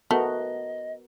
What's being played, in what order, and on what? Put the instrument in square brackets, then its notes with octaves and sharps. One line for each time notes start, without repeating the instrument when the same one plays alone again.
[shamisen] A3 [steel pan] B3 F#4 A#4 [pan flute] D#5